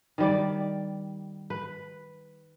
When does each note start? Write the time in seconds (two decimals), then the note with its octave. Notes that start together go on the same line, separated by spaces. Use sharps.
0.18 D#3 G3 D5
1.50 B4